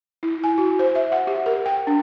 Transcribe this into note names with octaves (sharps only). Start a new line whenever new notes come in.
E4
G#5
F#4
C5
E5
F#5
G4
A#4
G5
D4